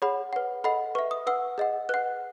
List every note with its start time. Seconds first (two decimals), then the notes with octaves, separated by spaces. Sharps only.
0.02 G#4 C#5 F#5 B5
0.33 B4 F#5
0.64 A4 D#5 F#5 B5
0.95 B4 E5 C#6
1.11 D#6
1.27 B4 F#5 E6
1.58 G#4 D#5 F#5
1.89 B4 F#5 F#6